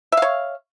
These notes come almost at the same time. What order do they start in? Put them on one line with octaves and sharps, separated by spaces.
E5 F5 C#5